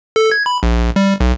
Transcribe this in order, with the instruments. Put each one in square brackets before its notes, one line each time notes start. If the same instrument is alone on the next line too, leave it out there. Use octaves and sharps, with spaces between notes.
[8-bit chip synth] A4
G#6
B5
A#1
G3
B1